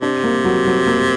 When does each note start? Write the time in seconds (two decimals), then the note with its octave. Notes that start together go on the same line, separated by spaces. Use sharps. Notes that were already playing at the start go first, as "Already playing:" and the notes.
0.02 C3 D4
0.24 A#3
0.44 F#3
0.66 F#3
0.87 A#3